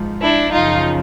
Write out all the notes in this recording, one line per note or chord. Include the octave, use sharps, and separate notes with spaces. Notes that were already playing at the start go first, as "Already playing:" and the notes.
Already playing: G#2 F3
D4 E4
F#2 C#3 F3 D#4 F4